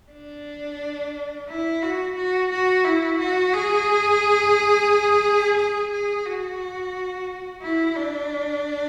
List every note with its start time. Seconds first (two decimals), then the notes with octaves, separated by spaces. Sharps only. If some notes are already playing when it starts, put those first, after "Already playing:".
0.12 D4
1.49 E4
1.82 F#4
2.16 F#4
2.51 F#4
2.85 E4
3.19 F#4
3.53 G#4
5.57 G#4
5.92 G#4
6.26 F#4
7.62 E4
7.96 D4